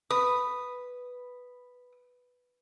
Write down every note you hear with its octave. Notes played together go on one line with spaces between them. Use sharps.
B4 D#6